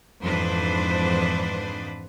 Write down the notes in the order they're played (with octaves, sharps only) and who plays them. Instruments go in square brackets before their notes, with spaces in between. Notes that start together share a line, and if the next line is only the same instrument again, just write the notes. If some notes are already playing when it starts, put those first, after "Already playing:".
[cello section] F2 G#2 E3 D4 B4 C5